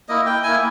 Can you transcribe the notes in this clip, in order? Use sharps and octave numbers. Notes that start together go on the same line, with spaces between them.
A#3 E4 D#5
G5
A#3 E4 G#5